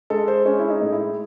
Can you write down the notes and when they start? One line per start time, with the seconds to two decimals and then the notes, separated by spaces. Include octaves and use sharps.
0.10 G#3 A4
0.28 C5
0.46 G#3 C#4
0.59 E4
0.70 D#4
0.82 A2
0.93 E4